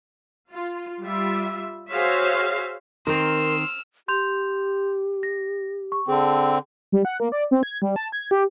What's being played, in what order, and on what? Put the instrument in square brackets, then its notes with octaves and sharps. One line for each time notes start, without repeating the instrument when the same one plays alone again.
[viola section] F4
G3 F4 E5
F#4 G#4 C5 C#5 E5 F5
[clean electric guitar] D#3 C4 [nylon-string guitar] A#4 [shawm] C6 [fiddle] E6 F6
[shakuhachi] G4 [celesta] C6 G6 F7
[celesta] A#6
C#6
[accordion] D3 C4 [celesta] G#4 A5
[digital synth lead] G3
F#5
A#3
D5
C4
G#6
G3
A5
G#6
G4